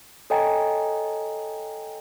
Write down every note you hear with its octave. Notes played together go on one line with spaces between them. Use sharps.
A4 C#5 D#5 G5 G#5 A#5